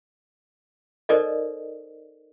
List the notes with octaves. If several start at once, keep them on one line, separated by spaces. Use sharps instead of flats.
D#4 A4 A#4 C5 D5 D#5